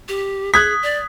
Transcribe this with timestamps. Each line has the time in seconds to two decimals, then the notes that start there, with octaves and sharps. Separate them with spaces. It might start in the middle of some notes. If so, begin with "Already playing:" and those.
0.09 G4
0.54 G#4 D#6 F#6 G#6 B6
0.83 D5